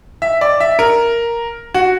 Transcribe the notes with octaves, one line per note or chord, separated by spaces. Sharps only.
E5
D5
E5
A#4
F#4